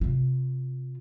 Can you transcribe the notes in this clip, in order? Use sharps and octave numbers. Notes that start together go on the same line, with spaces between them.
C3 F4